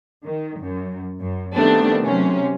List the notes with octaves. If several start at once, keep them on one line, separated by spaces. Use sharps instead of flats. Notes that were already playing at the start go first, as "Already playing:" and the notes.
D#3
F#2
F#2
D#3 G3 A3 B3 C4 D4
C3 F#3 C#4